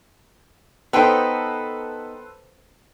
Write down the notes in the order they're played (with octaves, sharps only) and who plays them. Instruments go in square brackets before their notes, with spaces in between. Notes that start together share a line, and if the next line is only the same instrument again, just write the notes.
[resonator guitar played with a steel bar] B3 D#4 G5 [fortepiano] A4 B4 C5